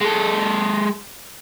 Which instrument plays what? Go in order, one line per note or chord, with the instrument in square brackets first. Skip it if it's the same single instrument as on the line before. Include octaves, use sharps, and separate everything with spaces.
[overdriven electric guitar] G#3 A4